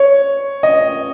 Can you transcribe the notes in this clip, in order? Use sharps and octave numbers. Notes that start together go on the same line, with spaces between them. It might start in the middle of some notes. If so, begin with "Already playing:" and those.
Already playing: C#5
D#5